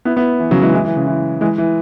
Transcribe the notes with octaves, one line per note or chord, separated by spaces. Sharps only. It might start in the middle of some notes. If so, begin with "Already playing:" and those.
B3 E4
B3 E4
E3
C#3 F#3
E3 G#3
E3 G#3
E3
C#3
E3
E3 G#3
E3